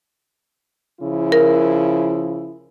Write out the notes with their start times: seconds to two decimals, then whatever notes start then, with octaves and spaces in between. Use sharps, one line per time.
1.00 C#3 F3 E4
1.32 A#4